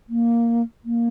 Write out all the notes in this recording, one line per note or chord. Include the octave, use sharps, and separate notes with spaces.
A#3
A#3